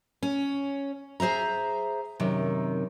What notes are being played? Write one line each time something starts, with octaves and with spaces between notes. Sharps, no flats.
C#4
G#4 C5 E5 A#5
F#2 C3 D#3